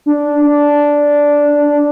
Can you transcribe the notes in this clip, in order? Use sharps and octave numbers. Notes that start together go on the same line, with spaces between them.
D4
D4